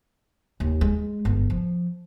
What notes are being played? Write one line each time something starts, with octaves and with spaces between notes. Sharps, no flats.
D#2
G#3
G1
F3